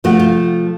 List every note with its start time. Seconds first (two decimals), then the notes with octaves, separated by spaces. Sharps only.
0.04 C3 F3 A3 F#4
0.19 F4